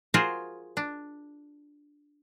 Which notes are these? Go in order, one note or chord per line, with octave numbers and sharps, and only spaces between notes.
F4 F#4 G#4 A#4 C5
D4